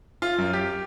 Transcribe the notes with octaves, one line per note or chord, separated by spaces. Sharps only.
F4
F#2
G4